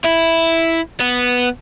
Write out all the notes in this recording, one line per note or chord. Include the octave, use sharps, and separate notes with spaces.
E4
B3